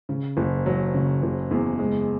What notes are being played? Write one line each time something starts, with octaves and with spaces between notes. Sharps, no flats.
C#3
F#1
F#3
C#3
F#1
E2
G#3